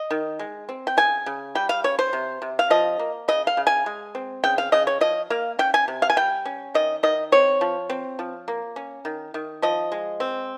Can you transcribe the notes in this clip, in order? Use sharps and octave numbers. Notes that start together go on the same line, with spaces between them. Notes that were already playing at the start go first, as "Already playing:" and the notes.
Already playing: D#5
D#3
G#3
C4
G5
C#3 G#5
C#3
G3 G5
F5
C#4 C#5
C5
C3
C3
F5
F3 D#5
A#3
C#3 D#5
F5
C#3
G#5
G#3
C4
C#3 G5
F5
C#3 D#5
C#5
F3 D#5
A#3 F5
C#4 G5
G#5
C3
F5
G#5
G3 G5
C#4
D#3 D#5
D#3 D#5
C4 C#5
F3
C4
F3
A#3
C#4
D#3
D#3
F3 D#5
G#3
C4